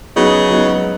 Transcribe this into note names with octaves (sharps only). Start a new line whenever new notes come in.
C#3 F#3 B3 D#4
F#3 B3 D#4